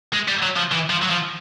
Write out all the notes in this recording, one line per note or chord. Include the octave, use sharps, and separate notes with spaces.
G#3
G3
F#3
F3
E3
F3
F#3
F3